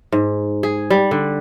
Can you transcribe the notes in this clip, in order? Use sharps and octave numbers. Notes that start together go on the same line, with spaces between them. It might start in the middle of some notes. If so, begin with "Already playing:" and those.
G#2
G#4
G3
D3